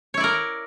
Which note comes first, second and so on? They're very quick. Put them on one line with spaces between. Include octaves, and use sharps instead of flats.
C#5 E4 D5 A#4